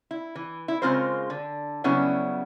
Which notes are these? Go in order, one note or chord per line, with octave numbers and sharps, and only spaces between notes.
E4
E3
E4
C#3 G#3 C4 F4 A#4 C5
D3
C#3 F#3 G3 B3 C#4 E4